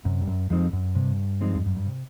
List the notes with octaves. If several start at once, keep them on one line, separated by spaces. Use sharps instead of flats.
F#2 C3
G2
F#2
F2 F3 G#3 C4 D#4
F#2
G2 C3
F3 G#3 C4 D#4
F2
F#2
G2
C3